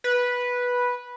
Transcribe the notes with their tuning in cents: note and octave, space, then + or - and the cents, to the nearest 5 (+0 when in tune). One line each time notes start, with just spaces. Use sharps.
B4 -10